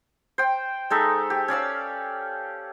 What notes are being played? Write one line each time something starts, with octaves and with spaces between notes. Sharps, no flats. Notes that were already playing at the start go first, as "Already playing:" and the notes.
C5 G5
G#3 D#4 A4 E5
G4
C#4 D5 F5 E6